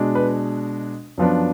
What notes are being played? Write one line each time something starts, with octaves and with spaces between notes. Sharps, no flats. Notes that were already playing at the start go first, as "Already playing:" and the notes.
Already playing: B2 G#3 D4
B4
F#2 F3 B3 D4